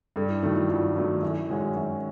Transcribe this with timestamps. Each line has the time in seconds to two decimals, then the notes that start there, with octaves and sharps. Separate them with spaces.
0.16 G2 A4
0.29 E4
0.43 D#3 F#3 A3 D#4
0.56 E4
0.69 G2 F4
0.96 D#3 F#3 A3
1.22 F#2 E4
1.49 D#3 G#3 C#4 F#4
1.76 F#2